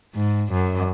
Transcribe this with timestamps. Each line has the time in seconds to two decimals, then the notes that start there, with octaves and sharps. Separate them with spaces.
0.14 G#2
0.53 F#2